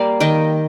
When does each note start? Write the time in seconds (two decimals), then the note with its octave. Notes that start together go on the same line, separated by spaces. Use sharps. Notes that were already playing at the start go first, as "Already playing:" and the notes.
Already playing: G3 A#3 D5 F5
0.20 D#3 D#5 G5